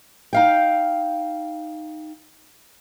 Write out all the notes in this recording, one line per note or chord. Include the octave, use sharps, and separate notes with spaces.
D#4 F5 G5